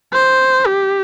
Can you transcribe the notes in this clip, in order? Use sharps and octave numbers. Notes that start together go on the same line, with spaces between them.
C5
G4